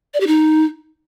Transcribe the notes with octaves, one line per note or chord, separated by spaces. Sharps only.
D5
G4
D#4